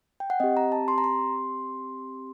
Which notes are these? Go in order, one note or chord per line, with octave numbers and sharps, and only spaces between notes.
G5
F#5
C4 G4 D#5
A#5
A5
C6
A#5
C6